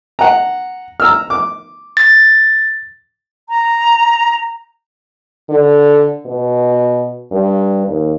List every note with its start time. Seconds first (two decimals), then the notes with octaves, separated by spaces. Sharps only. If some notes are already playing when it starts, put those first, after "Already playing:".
0.19 F#5 A#5
1.00 A#5 E6 F6
1.30 D6
1.97 A6
3.49 A#5
5.50 D3
6.26 B2
7.32 G2
7.87 D#2